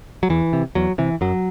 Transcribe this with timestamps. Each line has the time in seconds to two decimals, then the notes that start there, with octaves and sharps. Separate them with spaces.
0.23 F#3
0.29 E2 E3
0.53 C3
0.75 E2 F#3
0.98 C3 E3
1.21 F#2 F#3